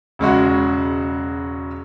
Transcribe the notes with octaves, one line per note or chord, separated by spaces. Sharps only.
E1 C#3 G#3 F#4